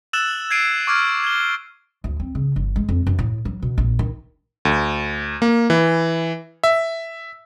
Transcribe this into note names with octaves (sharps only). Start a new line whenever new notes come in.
E6 F#6 A6 E7 F#7
G#6 A6 C7 D7 D#7
C#6 D6 F6 G#6
G#6 G7
D2
C4
C#3
G1
G#3
F2
F#2
A2
F#3
B2
A#1
D#3
D2
A#3
E3
E5